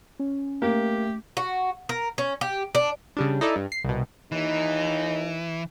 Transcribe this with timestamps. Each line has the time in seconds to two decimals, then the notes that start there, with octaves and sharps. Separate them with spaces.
0.19 C#4
0.62 A3 A#3 G4
1.37 F#4
1.89 A#4
2.18 C#4
2.41 G4
2.75 D4
3.17 C#3 G3 D4
3.41 D#4 E4 A4 D5
3.56 G2
3.72 C7
3.84 C2 B2
4.32 D#2 E3 D#4